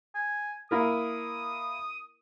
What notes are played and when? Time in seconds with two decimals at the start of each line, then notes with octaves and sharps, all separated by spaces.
0.15 G#5
0.71 A#3 E4 A#4 D#6